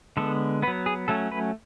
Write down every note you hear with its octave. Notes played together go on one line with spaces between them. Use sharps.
D3 G#3 B3 A4
F#3 B3 B4
G#4
F#3 A3 C#4 A4
B4